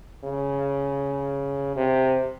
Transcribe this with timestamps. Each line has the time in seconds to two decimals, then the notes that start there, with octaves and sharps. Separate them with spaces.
0.24 C#3
1.76 C3